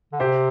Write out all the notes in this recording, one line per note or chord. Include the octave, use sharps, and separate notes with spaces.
D3
C3 G4 C5